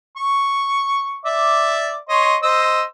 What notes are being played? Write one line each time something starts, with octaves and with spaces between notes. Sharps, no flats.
C#6
D5 E5 D6
C#5 D#5 C6
C5 D#5 E6